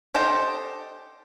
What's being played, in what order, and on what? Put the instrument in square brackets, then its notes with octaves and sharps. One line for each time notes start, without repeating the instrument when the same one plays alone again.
[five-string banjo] G4 A4 C5 D#5 G5